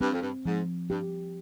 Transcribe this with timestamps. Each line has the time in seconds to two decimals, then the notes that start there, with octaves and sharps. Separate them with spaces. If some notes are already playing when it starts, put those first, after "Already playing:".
0.01 G2 C4
0.11 F2
0.21 G2
0.46 G#2 F3
0.90 G2 G4